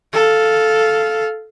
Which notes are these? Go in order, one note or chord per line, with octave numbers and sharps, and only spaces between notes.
A4 F5